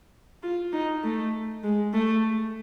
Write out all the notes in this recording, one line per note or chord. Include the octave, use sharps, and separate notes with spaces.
F4
D#4
A3
G#3
A3